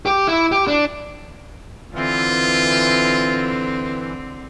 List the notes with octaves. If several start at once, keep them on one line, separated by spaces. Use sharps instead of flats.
G4
E4
G4
D4
D3 E3 C4 F4